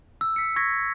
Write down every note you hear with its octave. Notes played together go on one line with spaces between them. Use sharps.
E6
B6 C#7
C#6 G#6 A#6 B6